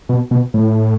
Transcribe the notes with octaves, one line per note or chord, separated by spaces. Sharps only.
B2
B2
A2